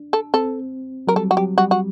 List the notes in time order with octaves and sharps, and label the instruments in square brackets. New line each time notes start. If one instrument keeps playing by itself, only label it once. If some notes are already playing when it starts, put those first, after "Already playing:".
Already playing: [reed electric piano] D4
[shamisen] A4
[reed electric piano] C4 [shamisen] A4
[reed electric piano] F#3 [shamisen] A#4
[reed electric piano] G3 [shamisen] A4
[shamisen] F#4
[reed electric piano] F#3 [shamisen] G4
[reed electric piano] G3 [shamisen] F#4
[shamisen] F#4